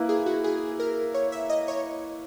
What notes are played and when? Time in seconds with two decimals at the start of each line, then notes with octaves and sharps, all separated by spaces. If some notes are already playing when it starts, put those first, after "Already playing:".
Already playing: A#3 E4 B4
0.09 G#4
0.26 F#4
0.44 G#4
0.80 A#4
1.14 C#5
1.32 E5
1.49 D#5
1.68 C#5